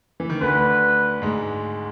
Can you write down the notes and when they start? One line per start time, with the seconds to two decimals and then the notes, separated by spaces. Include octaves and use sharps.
0.20 E3
0.30 D#3
0.41 D2 D3 B4
1.22 G#2 G#3